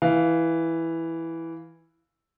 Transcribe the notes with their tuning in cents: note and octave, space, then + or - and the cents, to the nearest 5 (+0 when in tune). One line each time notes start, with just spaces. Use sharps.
E3 +0 F5 +0